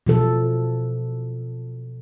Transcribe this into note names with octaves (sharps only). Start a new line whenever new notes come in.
B2 F3 A4